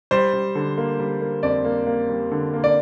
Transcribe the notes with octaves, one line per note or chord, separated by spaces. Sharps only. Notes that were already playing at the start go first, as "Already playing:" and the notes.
G3 C5
G3
D3
A#3
G3
A#3
F2 D5
A#3
A#3
G3
D3
A#3
D5